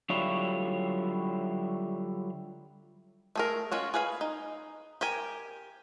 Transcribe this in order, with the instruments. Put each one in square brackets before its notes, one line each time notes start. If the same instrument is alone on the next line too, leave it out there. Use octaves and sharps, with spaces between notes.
[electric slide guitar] D3 F#3 G3 E4 F4 C#5
[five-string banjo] A3 G#4 A#4
G#3 C#4 F4 F#4
G#4 B4 F5 G#5
D#4
G4 A#4 G#5